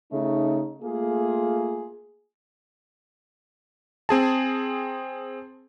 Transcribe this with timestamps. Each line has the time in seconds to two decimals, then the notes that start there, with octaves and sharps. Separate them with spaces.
0.12 C#3 A3 D#4
0.82 A3 A#3 F4 G#4
4.09 C4 G#4 A5